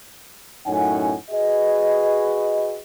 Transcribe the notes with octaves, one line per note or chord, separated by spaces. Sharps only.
F#2 A2 C#4 D#4 F#5 G#5
F#4 G#4 B4 D#5